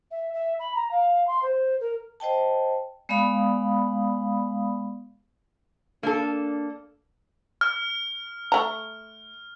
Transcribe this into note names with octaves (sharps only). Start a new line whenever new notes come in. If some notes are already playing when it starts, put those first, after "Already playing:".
E5
E5
B5
A#5
F5
C6
C5
A#4
C5 D#5 G5 A5
G#3 B3 D5 F5 B5 D#6
A#3 D4 A4
F6
A3 A#5